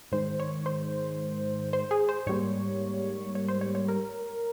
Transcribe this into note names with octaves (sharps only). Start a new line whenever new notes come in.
G#2 D#3 G#3 C5
C#5
C5
C5
G#4
C5
G#2 G3 A#3 C#5
C#5
C5
C#5
C#5
A#4